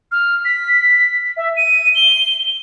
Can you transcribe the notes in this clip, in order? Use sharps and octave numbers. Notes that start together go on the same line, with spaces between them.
F6
B6
E5
D#7
G7